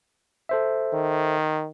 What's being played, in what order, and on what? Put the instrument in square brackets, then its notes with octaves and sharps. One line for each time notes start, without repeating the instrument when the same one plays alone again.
[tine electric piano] A4 C5 E5
[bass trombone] D#3